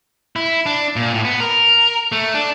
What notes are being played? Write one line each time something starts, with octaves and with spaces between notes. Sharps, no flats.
E4
D4
A#2
A2
B3
A#4
A3
D4